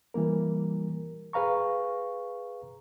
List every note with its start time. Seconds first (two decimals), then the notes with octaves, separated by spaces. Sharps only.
0.14 E3 G3 A#3 A#4
1.33 G#4 B4 F5 A#5 C#6